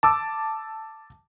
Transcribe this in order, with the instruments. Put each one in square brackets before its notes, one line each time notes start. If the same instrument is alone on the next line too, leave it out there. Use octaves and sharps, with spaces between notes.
[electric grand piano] A5 D6 E6